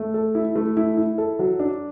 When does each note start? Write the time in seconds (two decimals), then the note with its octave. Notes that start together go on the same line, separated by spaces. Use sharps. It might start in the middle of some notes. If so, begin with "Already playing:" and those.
Already playing: A3
0.14 A4
0.35 E4
0.56 A3
0.77 E4
0.97 E4
1.18 A4
1.39 F#3
1.59 D4